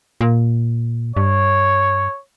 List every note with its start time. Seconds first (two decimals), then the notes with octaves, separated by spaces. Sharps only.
0.21 A#2
1.17 G2 C#5